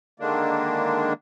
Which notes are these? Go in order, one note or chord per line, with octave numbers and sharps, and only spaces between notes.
D3 D#3 G#3 A#3 D4